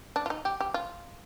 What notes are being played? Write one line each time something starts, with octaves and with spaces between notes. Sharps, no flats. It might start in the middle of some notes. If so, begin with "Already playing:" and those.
D4
F4
D#4
G4
G4
F4